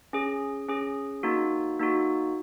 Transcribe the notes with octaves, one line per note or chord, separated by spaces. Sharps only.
C#4 G#4
C#4 G#4
A#3 D#4 F#4
A#3 D#4 F#4